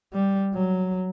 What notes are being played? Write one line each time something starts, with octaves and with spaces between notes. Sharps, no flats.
G3
F#3